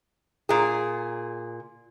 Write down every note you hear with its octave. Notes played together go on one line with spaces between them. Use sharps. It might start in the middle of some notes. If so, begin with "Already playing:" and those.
A#2 G#4